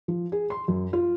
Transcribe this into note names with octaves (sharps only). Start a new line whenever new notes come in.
F3
G#4
C6
F#2
F4